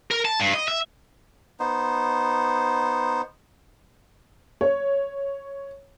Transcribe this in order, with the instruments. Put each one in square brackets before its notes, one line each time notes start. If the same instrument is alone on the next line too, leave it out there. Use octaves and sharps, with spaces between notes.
[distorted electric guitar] A#4
A5
G2
D#5
E5
[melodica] B3 D#4 C5
[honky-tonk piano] C#5